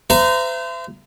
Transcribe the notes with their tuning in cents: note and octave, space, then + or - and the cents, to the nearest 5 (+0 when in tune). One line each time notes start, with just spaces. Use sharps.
C5 -35 E5 +35 A#5 +0